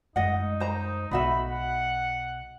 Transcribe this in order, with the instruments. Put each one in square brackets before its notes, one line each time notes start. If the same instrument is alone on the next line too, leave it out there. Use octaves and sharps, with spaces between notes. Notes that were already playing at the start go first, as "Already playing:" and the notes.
[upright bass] F#2 G#3 [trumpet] D#4 [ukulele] D#5 F#5
[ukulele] C5 A#5
[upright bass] B1 [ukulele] D#4 F#4 E5 [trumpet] B5
[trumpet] F#5